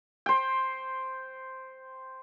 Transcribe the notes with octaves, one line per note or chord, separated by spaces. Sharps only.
C5 G5